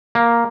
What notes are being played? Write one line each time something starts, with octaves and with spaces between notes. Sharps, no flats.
A#3